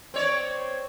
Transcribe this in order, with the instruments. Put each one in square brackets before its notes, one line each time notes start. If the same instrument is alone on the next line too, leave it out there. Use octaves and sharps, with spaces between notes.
[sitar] C4 C#5 D5